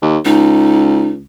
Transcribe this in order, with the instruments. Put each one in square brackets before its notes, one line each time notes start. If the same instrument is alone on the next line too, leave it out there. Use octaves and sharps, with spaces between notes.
[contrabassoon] D#2
[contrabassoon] C#2 [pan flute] D#4